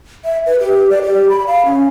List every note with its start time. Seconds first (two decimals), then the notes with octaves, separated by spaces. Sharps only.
0.25 E5
0.46 B4
0.60 G4
0.90 D5
1.03 G4
1.29 B5
1.47 F5
1.66 C#4